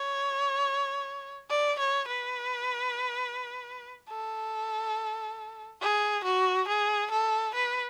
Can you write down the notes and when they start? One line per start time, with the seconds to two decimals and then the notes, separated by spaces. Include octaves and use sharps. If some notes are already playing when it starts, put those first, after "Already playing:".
Already playing: C#5
1.50 D5
1.79 C#5
2.08 B4
4.09 A4
5.81 G#4
6.24 F#4
6.68 G#4
7.11 A4
7.55 B4